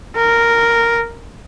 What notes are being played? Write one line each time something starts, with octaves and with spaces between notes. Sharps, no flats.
A#4